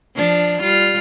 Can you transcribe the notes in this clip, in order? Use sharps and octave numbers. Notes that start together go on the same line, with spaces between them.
F3 D4
G3 F4